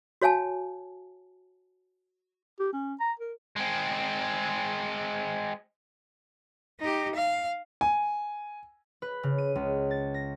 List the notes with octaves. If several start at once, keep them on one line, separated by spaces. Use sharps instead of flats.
F#4 C#5 F5 G#5 A5
G4
C#4
A#5
A#4
G#3 C4
D#4 G4
F5
G#5
B4
C#3
D#7
C#2
A6
A#6